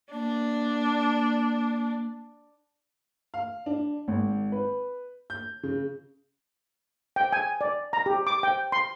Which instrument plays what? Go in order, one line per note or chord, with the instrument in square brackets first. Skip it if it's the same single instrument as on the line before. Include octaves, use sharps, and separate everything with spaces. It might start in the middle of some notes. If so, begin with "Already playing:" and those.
[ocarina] A#3 [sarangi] D4
[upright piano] F5
D4
G#1
B4
G6
C#3
[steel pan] G5
G#5
D5
A#5
G4
D6
G5
C6